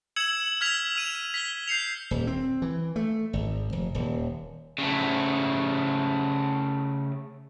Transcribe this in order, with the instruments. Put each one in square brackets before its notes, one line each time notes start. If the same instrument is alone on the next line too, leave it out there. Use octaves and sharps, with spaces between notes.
[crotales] E6 G#6 C#7 E7 F#7
F6 G#6 B6 F7 F#7
F6 D#7 F7
B6 G7
G6 C7 C#7 F7
[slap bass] D#1
C4
E3
A3
G#1
F1
D#1
[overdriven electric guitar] C#3 A3